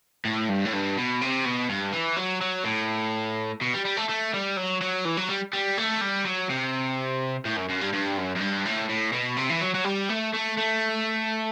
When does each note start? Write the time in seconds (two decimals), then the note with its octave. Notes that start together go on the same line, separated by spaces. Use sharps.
0.25 A2
0.49 G2
0.65 A2
0.73 G2
0.97 B2
1.21 C3
1.45 B2
1.69 G2
1.93 E3
2.16 F#3
2.41 F#3
2.65 A2
3.61 B2
3.74 G3
3.85 G3
3.97 A3
4.09 A3
4.34 G3
4.57 F#3
4.81 F#3
5.05 E3
5.17 F#3
5.29 G3
5.53 G3
5.77 A3
6.01 G3
6.25 F#3
6.49 C3
7.45 A2
7.56 F#2
7.69 F#2
7.81 G2
7.93 G2
8.17 F#2
8.36 F#2
8.40 G2
8.65 A2
8.89 A2
9.13 B2
9.37 C3
9.50 E3
9.61 F#3
9.75 F#3
9.84 G3
10.09 A3
10.33 A3
10.57 A3